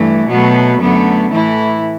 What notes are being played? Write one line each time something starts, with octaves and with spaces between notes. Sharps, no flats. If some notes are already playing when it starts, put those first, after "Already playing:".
Already playing: G2 E3 A3
B2 F#3 A3 B3
F#2 D3 A3 B3
A2 E3 A3 E4